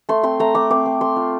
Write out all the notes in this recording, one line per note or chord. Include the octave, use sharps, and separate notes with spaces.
A3 C6
C4 C6
A3 A#5
A3 D6
C4 D6
C4
A3 C6
F4